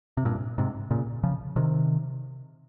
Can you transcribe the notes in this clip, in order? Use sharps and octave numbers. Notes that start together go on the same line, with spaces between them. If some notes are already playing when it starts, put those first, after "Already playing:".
C3
G2 A#2
G#2 C3
A#2 C#3
C#3 F3
C3 D#3